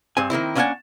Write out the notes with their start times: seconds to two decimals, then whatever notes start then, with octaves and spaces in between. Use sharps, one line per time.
0.17 G2 C4 G#5
0.30 D#3 A#3 C4 E4
0.55 A#3 C#4 D4 E5 F#5 G#5